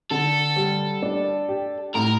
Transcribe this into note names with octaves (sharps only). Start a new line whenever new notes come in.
D3 A4
G3
D4
G4
A2 A#4